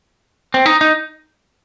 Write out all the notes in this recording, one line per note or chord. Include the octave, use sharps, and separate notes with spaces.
C4
D#4
D#4